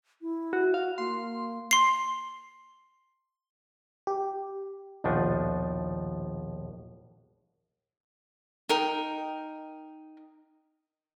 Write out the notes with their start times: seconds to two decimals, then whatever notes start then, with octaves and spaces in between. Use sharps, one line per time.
0.22 E4
0.53 F#4
0.74 F#4 F5
0.98 A#3 C6
1.71 C6 C7
4.07 G4
5.04 A#1 D#2 B2 F3 D4 D#4
8.69 D#4 A#4 G5